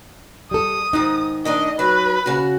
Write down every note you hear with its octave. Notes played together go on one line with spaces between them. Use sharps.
G3 A4 D#6
G#2 D#3 D#4
D#3 A3 D4 D#5
F#3 B4
C#3 F#4